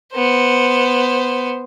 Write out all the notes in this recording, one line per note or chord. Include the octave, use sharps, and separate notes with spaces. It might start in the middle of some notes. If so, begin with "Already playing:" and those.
B3 C5